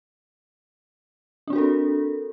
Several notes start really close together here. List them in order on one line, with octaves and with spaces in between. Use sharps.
D4 C4 F#4 A#4 A4